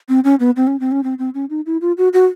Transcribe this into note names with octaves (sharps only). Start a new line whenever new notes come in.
C4
C#4
B3
C4
C#4
C4
C#4
C4
C4
C#4
D#4
E4
F4
F#4
F#4